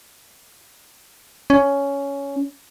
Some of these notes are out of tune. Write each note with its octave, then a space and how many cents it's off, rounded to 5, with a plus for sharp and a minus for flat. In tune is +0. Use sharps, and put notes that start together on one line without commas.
C#4 +10